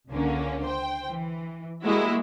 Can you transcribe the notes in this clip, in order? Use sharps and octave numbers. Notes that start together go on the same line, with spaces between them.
C#2 D3 A#3 C#4
C5 G5
E3
G3 G#3 A#3 E4 F#4